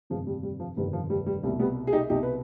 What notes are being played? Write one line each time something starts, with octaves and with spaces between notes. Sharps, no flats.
G1 F2 C3 D#3 F3 G#3
G3
G3
F3
G1 F2 C3 D#3 G3
F3
G3
G3
C2 B2 G3
G3 B3
G#4
D#4 G4
C2 B2 D#4 G4
B4